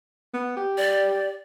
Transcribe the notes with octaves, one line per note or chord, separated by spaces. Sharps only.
B3
G4
D5